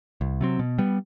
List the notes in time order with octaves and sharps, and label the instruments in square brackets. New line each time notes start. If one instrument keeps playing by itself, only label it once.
[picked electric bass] C2
C3 F#3 C4
B2
G3 B3